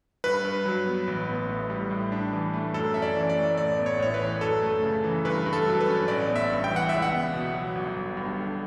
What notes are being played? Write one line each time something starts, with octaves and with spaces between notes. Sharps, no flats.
G2 B4
G2
F#3
B3
A1
B3
A2
G3
A2
D4
E3
A3
F#2 A4
C#4 E5
D5
E3
D5
A3
A1 D5
B3
C#5
A2 C#5
B4
E3
F#2 A4
A3
C#3
E3
G2 B4
G2
A4
F#3
B4
C#4
A1 D5
B3
E5
G2
G5
E3
F#5
C#2 E5
F#5
B3
B2
F#3
G1
G1
G2
D3